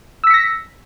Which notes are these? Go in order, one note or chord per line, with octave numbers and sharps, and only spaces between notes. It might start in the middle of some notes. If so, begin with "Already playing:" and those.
E6 A#6 B6 C#7